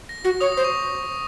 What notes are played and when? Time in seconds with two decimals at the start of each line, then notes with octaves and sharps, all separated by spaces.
0.09 A#6
0.24 F#4 A#6
0.41 C#5 D#6
0.52 C5 D#6
0.65 C#6